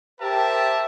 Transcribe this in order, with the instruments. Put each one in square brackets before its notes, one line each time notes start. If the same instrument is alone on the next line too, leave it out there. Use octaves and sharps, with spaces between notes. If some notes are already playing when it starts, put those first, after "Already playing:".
[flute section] G4 C5 G5 [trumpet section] A#4 E5 A5